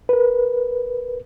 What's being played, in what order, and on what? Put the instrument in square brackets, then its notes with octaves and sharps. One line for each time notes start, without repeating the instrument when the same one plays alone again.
[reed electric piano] A#4 B4